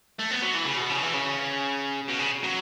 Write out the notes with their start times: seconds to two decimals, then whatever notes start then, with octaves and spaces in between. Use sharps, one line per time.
0.19 A3
0.31 B3
0.42 F#3
0.54 E3
0.65 C#3
0.77 B2
0.89 C#3
1.02 E3
1.14 C#3
2.08 B2
2.19 C#3
2.44 F#3